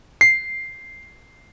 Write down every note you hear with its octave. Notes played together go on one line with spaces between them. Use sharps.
C7